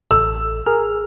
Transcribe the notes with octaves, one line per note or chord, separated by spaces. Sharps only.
A1 A4 E6
G#4 A#4 F6